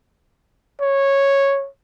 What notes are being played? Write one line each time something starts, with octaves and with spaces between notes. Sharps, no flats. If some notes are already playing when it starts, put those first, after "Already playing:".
C#5